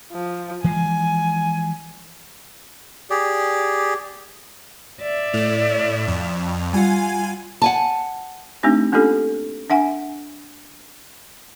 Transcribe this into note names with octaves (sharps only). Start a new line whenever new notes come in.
F3
E3 F3 G#3 G#5
G4 G#4 D5
D5 E5
A2 F7
F2
G3 F4 F#5 G#5
F#5 G#5 A5
A3 C4 D4 D#4 G4
A#3 C#4 D4 F4 G4 A4
D4 E5 F#5 G#5